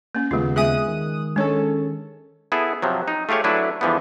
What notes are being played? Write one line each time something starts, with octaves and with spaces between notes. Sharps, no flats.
A#3 C#4
D#2 C#3 G#3 B3 F4
G#3 G#4 E5 G#5 D#6 F#6
D#3
G#3 C#4 D4 A4 C#5
B3 E4 G#4 A4
C3 F3 F#3
D#4
A3 F4 G4 G#4 C#5
F#3 A3 D4 E4 B4
E2 D3 E3 F3 G3 B3